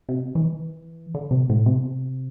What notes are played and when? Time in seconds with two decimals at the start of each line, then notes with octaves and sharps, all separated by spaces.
0.09 C3
0.35 E3
1.14 D3
1.31 C3
1.50 A2
1.66 C3